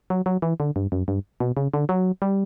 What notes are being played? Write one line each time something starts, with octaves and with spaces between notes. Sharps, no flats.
F#3
F#3
E3
D3
G2
F#2
G2
B2
C#3
D3
F#3
G3